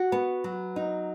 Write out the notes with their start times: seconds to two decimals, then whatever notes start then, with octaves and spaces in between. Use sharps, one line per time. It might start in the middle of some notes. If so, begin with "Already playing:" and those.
Already playing: F#4
0.12 B3
0.44 F#3
0.76 D#4